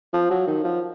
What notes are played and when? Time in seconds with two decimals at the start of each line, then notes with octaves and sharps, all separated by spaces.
0.13 F3
0.30 F#3
0.47 D#3
0.64 F3